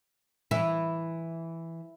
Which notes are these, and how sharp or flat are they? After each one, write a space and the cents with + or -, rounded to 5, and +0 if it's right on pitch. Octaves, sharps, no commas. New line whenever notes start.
E3 +0 E4 +0